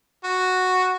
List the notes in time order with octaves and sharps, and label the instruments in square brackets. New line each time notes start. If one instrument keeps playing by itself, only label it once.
[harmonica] F#4